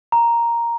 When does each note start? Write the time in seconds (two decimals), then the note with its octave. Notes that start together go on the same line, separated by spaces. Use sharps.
0.12 A#5